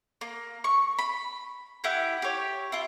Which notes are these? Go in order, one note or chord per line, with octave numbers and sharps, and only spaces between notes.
A#3
C#6
B5
E4 G4 F#5 G6
G4 C#5
E4 F4